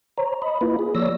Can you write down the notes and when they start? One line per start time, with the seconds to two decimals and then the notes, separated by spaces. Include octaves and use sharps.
0.18 C5 C#5 A#5
0.42 D#5 B5
0.61 A#3 E4 F4 B4
0.79 G#4
0.95 F3 A#3 C#5 D5 E6 A#6